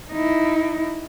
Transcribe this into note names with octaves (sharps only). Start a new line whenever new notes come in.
D#4 E4